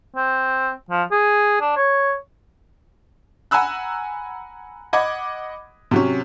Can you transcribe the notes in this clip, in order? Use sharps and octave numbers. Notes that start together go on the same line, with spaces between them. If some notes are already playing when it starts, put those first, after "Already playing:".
C4
F3
G#4
D4
C#5
F#5 G#5 A#5 B5 E6 F#6
D#5 F#5 B5 D6 G#6
C3 F#3 C#4